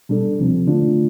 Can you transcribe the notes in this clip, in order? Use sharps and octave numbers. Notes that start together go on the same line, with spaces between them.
B2 G3 D4 A4
D2 C3 F3 C4
D3 A3 D4 F4